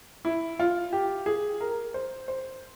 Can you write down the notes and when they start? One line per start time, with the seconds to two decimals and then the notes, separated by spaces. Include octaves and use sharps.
0.25 E4
0.60 F4
0.93 G4
1.26 G#4
1.61 A#4
1.94 C5
2.28 C5